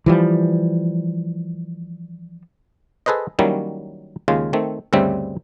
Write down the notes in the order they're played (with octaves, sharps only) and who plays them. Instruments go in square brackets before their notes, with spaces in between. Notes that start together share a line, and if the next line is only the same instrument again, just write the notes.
[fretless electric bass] E3 F3 G3
[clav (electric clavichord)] G#4 A4 B4 C5 D#5
D#3 F#3 G3 A#3 C#4 E4
D#2 C#3 G#3 F4 F5
D#3 A3 C4
D2 G2 C#3 G3 C4 E5